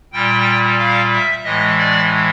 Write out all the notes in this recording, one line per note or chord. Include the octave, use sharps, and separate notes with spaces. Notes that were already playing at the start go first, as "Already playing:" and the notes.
A#2 G3 G5
F5
E5
A2 E3 G#3 D#5
D5